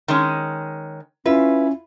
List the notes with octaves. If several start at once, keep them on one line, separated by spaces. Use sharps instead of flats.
D#3 G#3 C#4
C#4 E4 F4 B4 E5